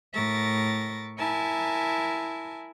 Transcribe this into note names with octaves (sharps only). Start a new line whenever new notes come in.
A2 A#4 E5 C#6 A6 A#6
E4 A#4 E5 G#5 A5